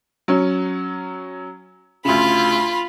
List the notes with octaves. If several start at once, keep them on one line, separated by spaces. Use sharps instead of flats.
F#3 C#4
D2 C#3 F4 B5